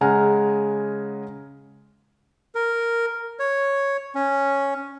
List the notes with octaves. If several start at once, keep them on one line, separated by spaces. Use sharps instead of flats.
C#3 G#3 F#5 G#5 A#5 F6
A#4
C#5
C#4